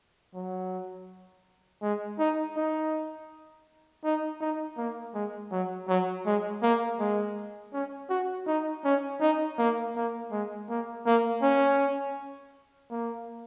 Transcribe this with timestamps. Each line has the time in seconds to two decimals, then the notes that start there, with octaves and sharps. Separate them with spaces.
0.34 F#3
1.82 G#3
2.19 D#4
2.57 D#4
4.04 D#4
4.41 D#4
4.77 A#3
5.14 G#3
5.52 F#3
5.88 F#3
6.26 G#3
6.62 A#3
6.99 G#3
7.73 C#4
8.10 F#4
8.47 D#4
8.84 C#4
9.21 D#4
9.58 A#3
9.96 A#3
10.31 G#3
10.69 A#3
11.06 A#3
11.42 C#4
12.91 A#3